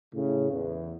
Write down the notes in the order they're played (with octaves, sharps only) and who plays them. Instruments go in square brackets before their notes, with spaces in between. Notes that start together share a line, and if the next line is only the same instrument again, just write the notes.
[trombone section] A2 C#3
E2